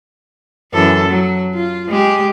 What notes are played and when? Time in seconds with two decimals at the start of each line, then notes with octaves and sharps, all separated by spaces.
0.73 F#2 E3 A4
1.10 F#3
1.54 F4
1.88 G#3 G4